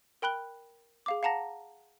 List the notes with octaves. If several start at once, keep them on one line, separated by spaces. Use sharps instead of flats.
A#4 G5 B5 F#6 G7
G#4 F5 D6
F5 F#5 A5 A#5 A#6